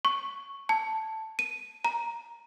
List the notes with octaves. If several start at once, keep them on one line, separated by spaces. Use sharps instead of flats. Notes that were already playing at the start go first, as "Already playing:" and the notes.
C#6
A5
D#7
A#5